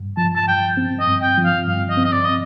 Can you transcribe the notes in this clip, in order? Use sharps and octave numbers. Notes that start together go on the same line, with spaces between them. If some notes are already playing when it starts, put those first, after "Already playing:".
Already playing: G2
F3 A5
A5
G2 G5
C4
D#5
G2
G5
F3
F5
G2 F5
D#5
C4
D#5
D5
D#5